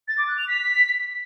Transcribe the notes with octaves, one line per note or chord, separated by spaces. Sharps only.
A6
D6
F#6
F7
B6